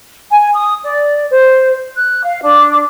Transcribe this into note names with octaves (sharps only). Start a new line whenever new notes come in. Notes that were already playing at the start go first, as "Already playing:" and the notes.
G#5
D#6
D5
C5
F#6
F5
D4